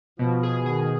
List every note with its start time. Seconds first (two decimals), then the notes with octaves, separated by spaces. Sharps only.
0.19 B2 F3
0.43 G#4
0.66 D#3 G#4